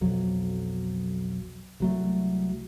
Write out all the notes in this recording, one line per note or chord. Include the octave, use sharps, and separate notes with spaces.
B1 F2 F#3
C2 F#3 A3